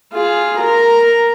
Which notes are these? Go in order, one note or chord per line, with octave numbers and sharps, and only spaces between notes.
F4 G#4
A#4 A#5